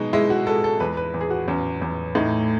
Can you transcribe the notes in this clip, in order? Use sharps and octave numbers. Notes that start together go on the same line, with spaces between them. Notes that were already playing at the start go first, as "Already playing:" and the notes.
Already playing: B2 G#3 D#4
G#3 E4
F#4
G#3 A4
A4
E2 B4
B4
E2
G#4
F#4
E2 C#4
E2
A2 D#4